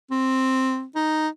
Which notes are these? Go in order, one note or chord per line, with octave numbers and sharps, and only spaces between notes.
C4
D#4